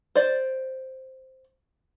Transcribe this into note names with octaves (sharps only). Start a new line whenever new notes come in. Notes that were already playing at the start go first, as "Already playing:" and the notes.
C5 D5